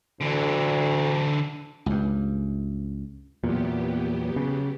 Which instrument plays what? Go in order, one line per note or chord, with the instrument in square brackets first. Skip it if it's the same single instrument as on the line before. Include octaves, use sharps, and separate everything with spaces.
[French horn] D2 [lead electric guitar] D3 E3
[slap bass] C#2 G2
[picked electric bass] E2 A#2 [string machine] F#3 B3 G4
[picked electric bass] C#3